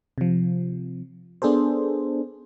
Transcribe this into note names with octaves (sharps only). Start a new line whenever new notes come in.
C3 F3
B3 D4 G#4 A4 C5